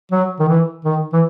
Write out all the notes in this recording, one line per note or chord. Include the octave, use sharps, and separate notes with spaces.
F#3
D#3
E3
D#3
E3